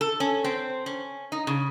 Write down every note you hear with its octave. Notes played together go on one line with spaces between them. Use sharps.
A4
C#4
C4
C#4
D#4
C#3